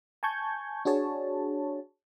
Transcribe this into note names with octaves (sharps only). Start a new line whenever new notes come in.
G#5 A5 C#6 G6 G#6
D4 F#4 G#4 C#5 A5